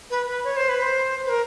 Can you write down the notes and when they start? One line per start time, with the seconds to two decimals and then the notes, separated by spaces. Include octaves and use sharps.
0.10 B4
0.27 B4
0.44 C#5
0.57 C5
0.69 B4
0.82 C5
1.25 B4
1.29 A#4